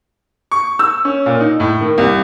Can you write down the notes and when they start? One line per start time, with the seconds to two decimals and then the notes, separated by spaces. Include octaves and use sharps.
0.51 C#6
0.79 E6
1.05 C#4
1.26 A#2
1.40 D#4
1.60 A2
1.81 D#3
1.98 C2